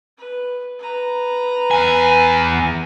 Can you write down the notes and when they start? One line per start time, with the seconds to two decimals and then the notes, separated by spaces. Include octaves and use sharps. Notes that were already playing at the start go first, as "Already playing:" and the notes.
0.18 B4
0.79 B4 A#5
1.71 E2 G#5